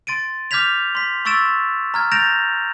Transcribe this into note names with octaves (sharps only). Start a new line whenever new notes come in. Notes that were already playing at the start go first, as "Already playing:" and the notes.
C6 A6 D7 D#7
D6 F6 G6 G#6 B6 F7
C6 B6
C6 C#6 E6 A6 D7 E7
A#5 F6 G#6
G6 A6 A#6 D7 E7 F7